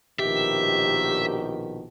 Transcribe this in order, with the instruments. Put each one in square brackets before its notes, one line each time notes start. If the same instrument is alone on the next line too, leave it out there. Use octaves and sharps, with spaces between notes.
[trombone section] A#1 B2 D#3 [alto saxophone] G4 [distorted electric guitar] E5